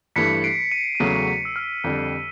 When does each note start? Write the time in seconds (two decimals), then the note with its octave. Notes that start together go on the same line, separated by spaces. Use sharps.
0.16 G2 E3 A3 B6 C#7
0.43 C7 D7
0.72 C#7 D#7
0.95 D#7
1.00 E2 C#3 F#3 A3 C#4 C7 D7
1.28 B6
1.45 E6
1.56 F6
1.84 F2 D3 G3